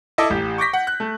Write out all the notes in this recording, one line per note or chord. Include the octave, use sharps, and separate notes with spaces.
E4 A4 D#5 A5 D6
A1 G4
C#6 D6 G6 A#6 B6
F#5
F#6
A3